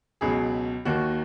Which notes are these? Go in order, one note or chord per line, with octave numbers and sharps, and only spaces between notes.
C#2 B2 F#3 G#4
D#2 D#3 A#3 F#4